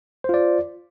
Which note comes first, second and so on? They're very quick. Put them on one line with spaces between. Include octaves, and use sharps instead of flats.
C5 F4 D5